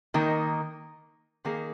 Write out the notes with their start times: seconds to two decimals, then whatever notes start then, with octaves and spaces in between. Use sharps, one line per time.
0.14 D#3 A#3 D#4 A#4
1.45 D#3 A#3 G#4